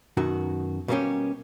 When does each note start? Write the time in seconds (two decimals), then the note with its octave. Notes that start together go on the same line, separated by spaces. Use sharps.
0.17 F#2 B2 D#3 F#4
0.88 B2 G3 A#3 B3 C#4 G4